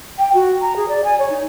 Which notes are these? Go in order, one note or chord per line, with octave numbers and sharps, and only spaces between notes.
G5
F#4
A#5
G#4
D5
G#5
C#5
D#4